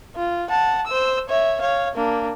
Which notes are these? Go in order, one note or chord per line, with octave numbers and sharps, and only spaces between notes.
F4
F#5 A5
C5 E6
C#5 E5
C#5 F5
A#3 D4